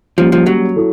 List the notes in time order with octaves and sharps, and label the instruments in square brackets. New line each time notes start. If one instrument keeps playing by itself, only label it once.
[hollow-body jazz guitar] F3 [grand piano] G3 A#3 C#4
[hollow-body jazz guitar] F3
F#3
[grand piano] E4 A4